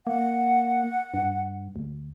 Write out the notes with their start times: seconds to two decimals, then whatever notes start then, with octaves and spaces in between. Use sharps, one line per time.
0.07 A#3 F#5
1.14 G2
1.76 D2